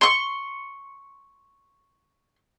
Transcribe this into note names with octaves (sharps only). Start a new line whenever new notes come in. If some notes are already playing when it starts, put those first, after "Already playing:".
C6 C#6